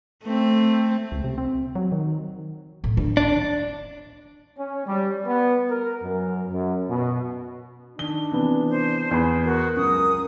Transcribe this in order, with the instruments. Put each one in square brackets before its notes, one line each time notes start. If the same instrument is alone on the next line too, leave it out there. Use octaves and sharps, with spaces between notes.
[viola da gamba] A3 C4
[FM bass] C#2
C3
C4
F#3
D#3
[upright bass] A2
D3
[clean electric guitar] D4
[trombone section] C#4
G3
B3
A#4
F#2
F#2
B2
[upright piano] D#3 G7 [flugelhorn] D4
[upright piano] C3 E3 B3
[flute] C5
[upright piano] E2 B5
[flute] F#4 [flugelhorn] A#4
[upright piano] C#2 F#2 [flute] D#6